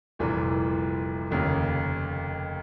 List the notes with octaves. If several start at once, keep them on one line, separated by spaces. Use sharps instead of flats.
F1 C2 A#2 E3
F1 D#2 C#3 A#3